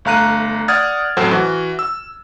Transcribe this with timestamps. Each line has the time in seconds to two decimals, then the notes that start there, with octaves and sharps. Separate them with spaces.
0.05 G1 A3 F5 A#5 F#6 D#7
0.68 D5 F#5 D#6 F6 G#6 A6
1.17 A1 F2 F#3 A4 C5 F#5
1.31 E3 F#4
1.79 E6